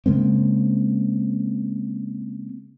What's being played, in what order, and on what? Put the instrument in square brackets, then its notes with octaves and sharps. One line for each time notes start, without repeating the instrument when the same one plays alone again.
[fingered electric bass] C#3 G#3 A#3 C4